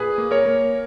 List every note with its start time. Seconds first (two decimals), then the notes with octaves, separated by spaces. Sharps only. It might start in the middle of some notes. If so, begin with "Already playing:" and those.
Already playing: A#2 G#4 B4
0.18 A#3
0.31 A#4 C#5
0.46 A#3